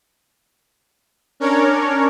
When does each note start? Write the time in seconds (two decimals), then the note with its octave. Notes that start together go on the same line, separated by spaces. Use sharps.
1.40 C#4 D4 A#4 C#5